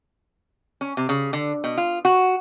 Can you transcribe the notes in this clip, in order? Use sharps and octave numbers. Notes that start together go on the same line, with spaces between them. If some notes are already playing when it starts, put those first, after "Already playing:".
C#4
C3
C#3
D3
B2
F4
F#4